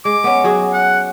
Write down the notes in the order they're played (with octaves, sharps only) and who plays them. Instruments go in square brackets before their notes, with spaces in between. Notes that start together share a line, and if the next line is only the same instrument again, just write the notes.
[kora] G#3 [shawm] D6
[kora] B3 C#4
F#3 F#4 G#4
[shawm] F#5